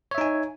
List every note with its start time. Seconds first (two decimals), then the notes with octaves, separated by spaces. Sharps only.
0.11 C#5
0.15 E5
0.18 D#4
0.21 G#5